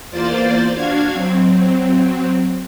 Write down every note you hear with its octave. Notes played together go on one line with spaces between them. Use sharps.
E2 A#3 F4 C5 D5 A6
D4 F#4 F5 G#6
F#3 C4